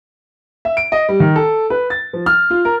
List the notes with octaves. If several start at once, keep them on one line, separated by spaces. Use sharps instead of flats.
E5
D7
D#5
G3
D#3
A4
B4
A6
F3
F6
F4
A#4